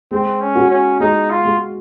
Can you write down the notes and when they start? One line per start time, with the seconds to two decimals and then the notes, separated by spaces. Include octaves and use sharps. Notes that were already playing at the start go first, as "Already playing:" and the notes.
0.11 G#3 C4
0.41 C#4
0.55 F#4
0.70 C#4
1.00 G#3 D#4
1.30 F4
1.45 G#3